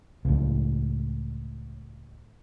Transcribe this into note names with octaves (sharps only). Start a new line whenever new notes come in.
C#2 A2